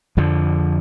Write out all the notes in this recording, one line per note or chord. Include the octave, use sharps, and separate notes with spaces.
F2 D3 F3